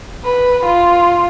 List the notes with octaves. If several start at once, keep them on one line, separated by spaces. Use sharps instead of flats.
B4
F4